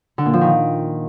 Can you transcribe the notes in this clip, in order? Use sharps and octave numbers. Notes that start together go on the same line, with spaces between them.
D3
A#2
F3
D#3